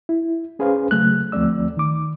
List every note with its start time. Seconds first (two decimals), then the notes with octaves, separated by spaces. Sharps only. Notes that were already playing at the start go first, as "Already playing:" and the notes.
0.09 E4
0.59 C#4 G#4 B4 C5 F5
0.91 C#3 F#3 A3 F#6
1.32 D2 F3 A3 C4 D5 E6
1.77 D#3 D6